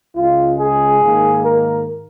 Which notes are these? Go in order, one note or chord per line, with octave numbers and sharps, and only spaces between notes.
C#2 C#3 G#3 F4
G#4
G#2 D#3 A#3
A#4